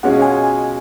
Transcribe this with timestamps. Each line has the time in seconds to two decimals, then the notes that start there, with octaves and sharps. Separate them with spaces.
0.03 B2 G#3 C#4 F4 F#5
0.22 G#5